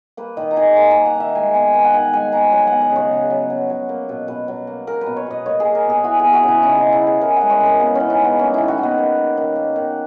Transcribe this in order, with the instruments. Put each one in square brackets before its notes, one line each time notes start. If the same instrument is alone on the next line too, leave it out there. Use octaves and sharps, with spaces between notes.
[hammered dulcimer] A#3 B4
D#3 D#5
A#5
D#3 G#5
A#3 A#5
A#5
A#3
F#5
D#3
E5
G#3 G#5
B3 G#5
D#3 A#5
F#5
D#3 G#5
G#3 G#5
B3 A#5
F#3 G#5
B3 F#5
D#5
C#3 C#5
C#3
F#3
B3
F#3
A#3
B2
B2 B4
F#3
A#3
A#3 A#4
B4
B2
C#5
B2 D#5
A#3 C#5
G#4
A#3
A#4
B2 G#4
E3 F#4
B3 G#4
F#4
C#3 E4
C#3 D#4
E3 D#4
E4
B3
G#4
E3 A#4
G#3 F#5
C#5
C#3 A#4
C#3 B3
E3 C#4
D#4
G#3 B3
A#3 C#4
D#3 E4
F#4
D#3
B3
A#3
A#3
D#3
A#3
D#3